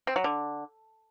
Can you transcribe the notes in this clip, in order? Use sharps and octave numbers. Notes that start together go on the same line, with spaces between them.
C4
F#3
D3